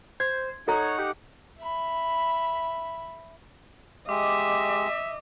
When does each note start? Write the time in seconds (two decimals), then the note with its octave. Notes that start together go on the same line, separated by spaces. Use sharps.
0.20 C5 G#6
0.68 D#4 A4 C#5 F#5 A#5
0.98 G4
1.59 E5 B5
4.09 G#3 G4 D#5 E5 D6